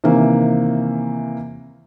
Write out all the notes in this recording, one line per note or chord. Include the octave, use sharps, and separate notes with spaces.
C3 D#3 E3 A#3